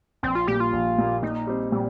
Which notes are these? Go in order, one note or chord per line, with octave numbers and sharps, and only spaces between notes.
A#1 C4
F4
A#2 G3 A#3 G4
F4
A#1
A#2 G3 A#3
A#2 D#4
G3 C4
A#2 G3